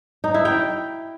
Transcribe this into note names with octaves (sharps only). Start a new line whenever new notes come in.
D#4
E4
G5